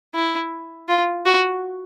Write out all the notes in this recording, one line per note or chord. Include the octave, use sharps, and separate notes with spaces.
E4
F4
F#4